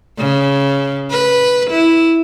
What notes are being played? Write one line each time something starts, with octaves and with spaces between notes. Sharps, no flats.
C#3
B4
E4